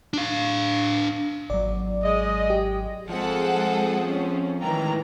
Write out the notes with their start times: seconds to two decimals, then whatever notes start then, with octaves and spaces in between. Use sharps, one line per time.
0.13 D4 F5
1.50 G#1 F#3 D5
2.04 G#3 D#5
2.50 G4
3.09 F3 G#3 C4 G#4 A4 C5 F#5
4.05 C#4
4.62 A2 D#3 E3 G#3 G5 A#5